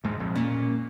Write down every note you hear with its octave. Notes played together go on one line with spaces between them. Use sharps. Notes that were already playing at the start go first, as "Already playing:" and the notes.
D2 G#2 G#3
A#1 F2
A#2 C#4